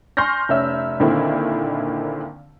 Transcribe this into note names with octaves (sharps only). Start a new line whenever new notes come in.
G#5 C6 C#6 F6 G6 A#6
F1 C#4 E5 E6
A#2 D3 D#3 C4 E4